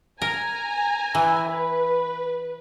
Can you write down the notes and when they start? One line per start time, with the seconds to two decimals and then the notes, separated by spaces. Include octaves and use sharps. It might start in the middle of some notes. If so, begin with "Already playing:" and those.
0.22 A#4 G#5 A#5
1.15 E3 E4
1.49 B4 B5